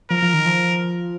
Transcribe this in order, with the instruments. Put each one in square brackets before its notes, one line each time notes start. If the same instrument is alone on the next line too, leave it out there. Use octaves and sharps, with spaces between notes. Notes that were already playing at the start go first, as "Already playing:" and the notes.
[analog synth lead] F3 [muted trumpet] A#4
[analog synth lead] F3
D#3
F3